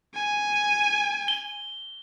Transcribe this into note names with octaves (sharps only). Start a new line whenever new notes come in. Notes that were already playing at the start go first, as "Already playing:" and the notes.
G#5
G7